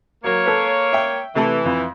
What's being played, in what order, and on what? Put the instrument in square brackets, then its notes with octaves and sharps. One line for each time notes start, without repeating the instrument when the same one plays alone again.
[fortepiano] F#3 A#4 [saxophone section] A#3 C#5
[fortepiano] A4 B4
E5 G5
[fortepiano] C3 A3 A5 [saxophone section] E3
[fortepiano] F2